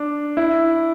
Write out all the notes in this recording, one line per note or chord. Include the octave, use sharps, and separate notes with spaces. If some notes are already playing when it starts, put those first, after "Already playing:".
Already playing: D4
E4